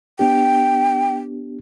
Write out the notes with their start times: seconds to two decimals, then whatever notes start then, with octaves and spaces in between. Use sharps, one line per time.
0.19 B3 D4 G4 G5